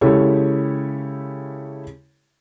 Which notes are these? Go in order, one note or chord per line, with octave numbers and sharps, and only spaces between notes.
C#3 G#3 E4 G4 A4 C#5